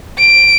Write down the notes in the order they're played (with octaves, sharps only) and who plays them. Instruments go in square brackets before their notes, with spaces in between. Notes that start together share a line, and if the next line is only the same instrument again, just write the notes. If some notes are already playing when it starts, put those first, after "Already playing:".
[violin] D7